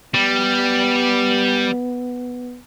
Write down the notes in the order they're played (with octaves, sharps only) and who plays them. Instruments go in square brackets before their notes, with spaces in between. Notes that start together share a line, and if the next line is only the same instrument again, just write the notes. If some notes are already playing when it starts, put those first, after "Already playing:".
[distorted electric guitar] G3 [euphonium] B3